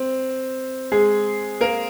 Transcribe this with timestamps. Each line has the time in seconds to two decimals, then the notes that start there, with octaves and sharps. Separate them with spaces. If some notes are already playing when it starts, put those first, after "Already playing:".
Already playing: C4
0.92 G#3 G#4
1.61 A#3 A#4